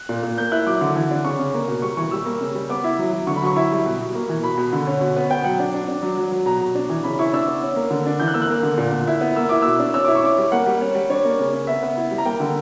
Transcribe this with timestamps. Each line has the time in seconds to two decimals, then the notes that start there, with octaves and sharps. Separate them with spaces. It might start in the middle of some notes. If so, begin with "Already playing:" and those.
Already playing: F#6
0.09 A#2
0.23 A#2
0.38 A#3 G6
0.52 E4 F#6
0.66 F#3 D6
0.81 D3
0.96 E3
1.11 D4
1.24 C#3 C#6
1.39 C#3
1.54 A#3
1.68 B2
1.82 G3 C#6
1.97 E3 C#6
2.11 G3 E6
2.26 A#3
2.41 C#3
2.55 G3
2.69 B3 D6
2.84 E4
2.99 F#3
3.13 F#3
3.27 D3 C#6
3.36 B5
3.42 F#3 C#6
3.56 E4
3.72 G3
3.86 B2
4.00 B2
4.15 A#3
4.29 E3
4.43 B2 B5
4.58 B2
4.73 D3
4.87 C#4
5.01 B2
5.16 B3
5.31 B3 G5
5.44 F#3 F#5
5.59 D4
5.74 D4
5.88 D4
6.02 F#3
6.17 F#3
6.32 F#3
6.46 B2 A#5
6.61 B2
6.75 D4
6.89 E3
7.04 C#3 B5
7.19 E4 C#6
7.33 D4 E6
7.47 B3
7.62 C#4
7.76 A#3
7.91 D3
8.06 D4
8.20 E3 G6
8.28 F#6
8.34 A#3 E6
8.42 F#6
8.50 A#3
8.63 D3
8.78 A#2
8.92 A#2
9.07 E4
9.21 B3
9.36 A#3 E6
9.49 E4 D6
9.62 B2 E6
9.79 D4
9.94 C#4 E6
10.05 E4 D6
10.15 C#6
10.23 C#4 D6
10.38 G3
10.52 A#3 F#5
10.66 G3
10.81 C#4
10.95 G3
11.10 D4 C#5
11.25 A#3
11.39 C#3
11.53 C#3
11.67 B3 E5
11.83 B3
11.97 E4
12.11 G3
12.18 A#5
12.25 A#3 G5
12.40 D3